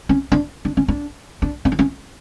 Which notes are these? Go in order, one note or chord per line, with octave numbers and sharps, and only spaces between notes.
C#4
D4
D4
C#4
D4
D4
C#4
D4
C#4